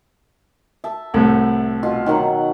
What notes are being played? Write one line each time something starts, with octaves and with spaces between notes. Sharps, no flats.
E5 A5
C2 A2 F#5
B2 F4
D#3 F#3 F#5